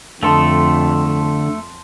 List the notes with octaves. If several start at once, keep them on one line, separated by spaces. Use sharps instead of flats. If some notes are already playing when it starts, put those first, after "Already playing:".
F2 D3 A3 A4 A5 C6 D#6